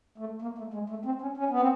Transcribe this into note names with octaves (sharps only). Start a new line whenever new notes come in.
A3
A#3
A3
G#3
A3
C4
C#4
C#4
B3
C4